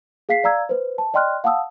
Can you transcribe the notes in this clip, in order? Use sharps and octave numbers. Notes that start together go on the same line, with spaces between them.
G#4 F5 B6 C7
D5 F5 A#5 E6 G#6
B4 C5
A5
D5 D#5 G5 C6 F6 F#6
F5 F#5 A5 D#6 E6